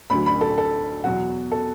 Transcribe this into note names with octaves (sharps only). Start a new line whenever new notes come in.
D2 D3 F#3 B5
B5
A4
A4
E2 B2 F#3 F#4
A4